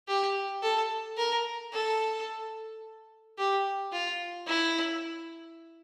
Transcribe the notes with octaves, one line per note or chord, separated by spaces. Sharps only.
G4
A4
A#4
A4
G4
F4
E4